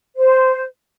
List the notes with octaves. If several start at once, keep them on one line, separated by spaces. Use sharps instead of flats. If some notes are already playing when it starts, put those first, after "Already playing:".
C5